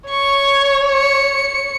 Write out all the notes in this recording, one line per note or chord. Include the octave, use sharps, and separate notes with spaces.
C#5 C#6
C#7